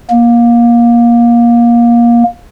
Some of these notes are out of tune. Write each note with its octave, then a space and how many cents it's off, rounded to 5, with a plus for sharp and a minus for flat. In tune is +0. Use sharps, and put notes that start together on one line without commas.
A#3 +20